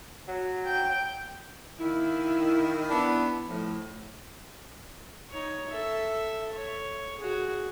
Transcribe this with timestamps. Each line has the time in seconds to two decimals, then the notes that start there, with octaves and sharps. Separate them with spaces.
0.28 F#3
0.66 G5
1.80 D#3 A#3 E4
2.89 B3 D4 E4
3.47 A2 F3
5.31 D#4 C#5
5.70 A4 E5
6.54 C#5
7.19 F#4 G#4